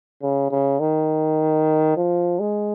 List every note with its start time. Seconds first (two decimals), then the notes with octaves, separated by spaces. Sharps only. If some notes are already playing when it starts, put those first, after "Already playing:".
0.22 C#3
0.51 C#3
0.80 D#3
1.97 F3
2.40 G#3